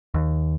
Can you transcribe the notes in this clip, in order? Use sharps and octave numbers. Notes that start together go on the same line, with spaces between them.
D#2